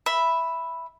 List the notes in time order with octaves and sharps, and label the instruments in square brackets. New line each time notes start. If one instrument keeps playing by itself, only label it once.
[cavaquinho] E5 B5